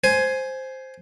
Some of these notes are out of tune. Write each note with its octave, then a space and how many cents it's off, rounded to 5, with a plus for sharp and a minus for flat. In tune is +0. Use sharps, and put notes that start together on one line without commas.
C5 +0 G#5 +10